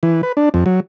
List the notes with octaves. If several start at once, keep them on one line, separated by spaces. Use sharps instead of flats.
E3
B4
D4
F2
F#3